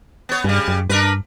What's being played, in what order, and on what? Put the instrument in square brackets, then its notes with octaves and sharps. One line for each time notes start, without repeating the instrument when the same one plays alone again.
[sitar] B3 C#5
[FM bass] G2 [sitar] C#3 G3
[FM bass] F#2
[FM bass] G2 [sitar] D4 A#4 B4